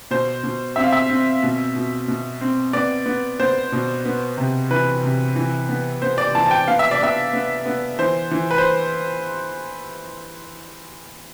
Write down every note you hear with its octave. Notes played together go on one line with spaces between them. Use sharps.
B2 C5
B2
C4 E5
F5
E5
C4
B2
B2
B2
C4
B3 D5
B3
B3 C5
B2
B3
C3
E3 B4
C3
E3
B3
B3 C5
D5
E3 A5
A5
G5
B3 F5
E5
D5
B3 E5
B3
B3
E3 C5
E3
B4
C5